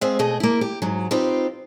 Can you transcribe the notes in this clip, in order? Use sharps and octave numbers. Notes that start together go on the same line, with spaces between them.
G#3 C4 G#4 E5 F5
B2 A3 G#4 D#5
A#3 E4
G4
G#2 F#3
C4 D#4 F4 G4 B4